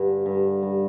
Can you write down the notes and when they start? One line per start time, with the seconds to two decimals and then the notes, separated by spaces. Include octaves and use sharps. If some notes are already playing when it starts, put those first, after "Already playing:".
Already playing: G2 D3
0.26 G2
0.63 G2